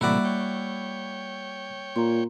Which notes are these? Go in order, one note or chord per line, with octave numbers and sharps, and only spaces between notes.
A2 C3 E3 G3 A#3 E4 F#4 D5
C#5 G5
A#2 A#5 C6